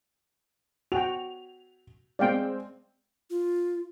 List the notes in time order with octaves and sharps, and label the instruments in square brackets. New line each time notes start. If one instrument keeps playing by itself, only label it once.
[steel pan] F#4 G5 [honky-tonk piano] F7
[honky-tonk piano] G#3 C4 [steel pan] D5 F5 G5
[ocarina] F4